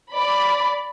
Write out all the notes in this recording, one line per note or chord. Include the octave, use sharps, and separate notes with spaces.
D5 B5